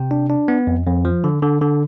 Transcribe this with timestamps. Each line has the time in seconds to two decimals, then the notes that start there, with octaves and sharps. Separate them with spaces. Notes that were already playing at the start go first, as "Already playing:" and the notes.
Already playing: C3 G5
0.11 D4
0.30 D4
0.48 B3
0.67 F2
0.86 F2
1.05 F3
1.24 D3
1.42 D3
1.61 D3